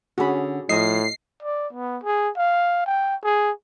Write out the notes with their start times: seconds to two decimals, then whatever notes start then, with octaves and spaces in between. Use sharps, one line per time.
0.18 D3 C#4 F#4 G#4 B5
0.69 A2 F3 D#5 C7
1.43 D5
1.73 B3
2.04 G#4
2.37 F5
2.86 G5
3.24 G#4